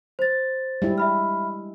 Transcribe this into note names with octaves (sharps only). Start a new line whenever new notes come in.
C5 A6
G3 G#3 E4
E5 B5 F6